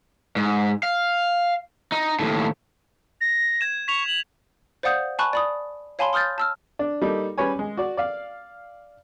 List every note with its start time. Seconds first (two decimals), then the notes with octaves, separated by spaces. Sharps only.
0.36 G#2
0.83 F5
1.92 D#4
2.19 D#2 A2
3.21 A#6
3.61 G#6 E7
3.88 C#6 B6 F7
4.07 F#7
4.83 C5 D5 F5 F#5 D#6 G6
5.19 G#5 A5 B5 C#6 F#6
5.33 D5 B5 D#6
5.99 C#5 F5 G#5 A5 B5 C6
6.13 C6 D#6 F6 G6 A6
6.38 A5 E6 F6
6.79 D4
7.02 G3 A#3 D#4 A4
7.38 G3 C#4 B4 C#5 G#5
7.59 G#3
7.77 F#4 D5
7.97 D5 F5